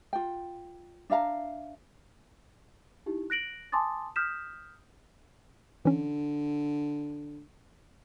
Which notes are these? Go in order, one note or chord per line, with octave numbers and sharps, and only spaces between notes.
F4 G5
D4 E5 F5 A#5
D#4 E4 G4
F#6 A#6 D7 F#7
G#5 A5 C6 D6 D#6 A6
D#6 F6 G6 B6 E7
D3 E3 C#4